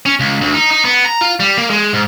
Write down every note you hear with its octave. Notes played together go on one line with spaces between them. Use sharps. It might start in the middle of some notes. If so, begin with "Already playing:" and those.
C#4
C#2
D2
D#4
D#4
B3
A#5
F4
G3
A#3
G#3
G#2